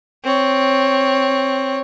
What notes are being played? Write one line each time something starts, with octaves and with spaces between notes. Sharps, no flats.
C4 C#5